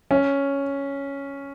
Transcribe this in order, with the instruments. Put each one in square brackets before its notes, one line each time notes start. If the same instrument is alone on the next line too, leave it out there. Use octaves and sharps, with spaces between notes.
[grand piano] C#4